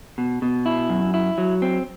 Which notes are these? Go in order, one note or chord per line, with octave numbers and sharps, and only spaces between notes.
B2
B2
E4
F#2
E4
F#3
C4